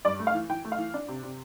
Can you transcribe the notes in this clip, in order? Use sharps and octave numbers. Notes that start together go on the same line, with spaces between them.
G2 D5
A3
F5
E3
E3 G5
A3
F5
E3
D4
C3
C3